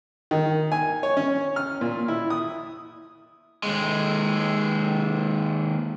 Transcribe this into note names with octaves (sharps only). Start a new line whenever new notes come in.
D#3
G#5
C#5
C#4
F6
A#2
E4
D#6
D#2 G#3